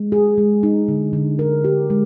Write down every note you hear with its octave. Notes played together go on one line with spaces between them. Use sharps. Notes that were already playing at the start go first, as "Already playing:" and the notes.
Already playing: G#3
G#4
G#3
D#4
D3
D3
A#4
G4
G#3